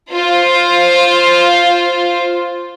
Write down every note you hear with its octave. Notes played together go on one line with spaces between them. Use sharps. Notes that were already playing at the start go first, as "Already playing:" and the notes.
F4 C5